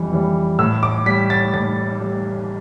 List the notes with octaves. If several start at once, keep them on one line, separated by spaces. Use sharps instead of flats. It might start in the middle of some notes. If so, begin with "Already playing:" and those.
Already playing: F2 E3 G3
E3 G3
A2 E6
D6
G3 B6
A6
A2 A6
G3